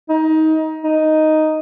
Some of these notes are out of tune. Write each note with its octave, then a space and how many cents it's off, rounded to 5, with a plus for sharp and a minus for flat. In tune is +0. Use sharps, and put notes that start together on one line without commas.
D#4 +20
D#4 +0